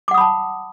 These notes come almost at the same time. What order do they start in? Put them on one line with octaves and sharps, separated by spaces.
D6 F#5 D#6 B5 A5